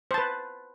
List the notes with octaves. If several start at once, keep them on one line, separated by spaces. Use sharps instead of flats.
B4 C5 A5